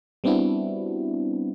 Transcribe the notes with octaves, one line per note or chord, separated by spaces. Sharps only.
G3 B3 C4 D4 E4 F#4